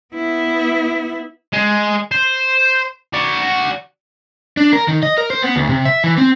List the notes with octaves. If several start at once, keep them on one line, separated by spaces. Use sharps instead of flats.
B3 E4
G#3
C5
F#4 D5
D4
A#4
D#3
D#5
A#4
C5
B3
D2
C3
E5
E3
C4